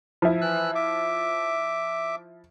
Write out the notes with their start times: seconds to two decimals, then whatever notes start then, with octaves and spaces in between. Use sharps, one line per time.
0.22 F3 E4
0.41 E3 E6 F#6
0.75 E5 D6